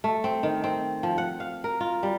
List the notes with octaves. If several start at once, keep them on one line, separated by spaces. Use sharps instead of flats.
A3
C4
D#3
C4
F3
F#5
F5
A#4
F4
G3